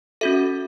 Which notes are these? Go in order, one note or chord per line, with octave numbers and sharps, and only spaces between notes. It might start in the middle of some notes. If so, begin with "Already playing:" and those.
C#4 F#4 A4 E5